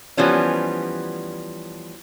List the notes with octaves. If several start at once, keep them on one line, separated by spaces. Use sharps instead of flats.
E3 F3 G3 B3 C#4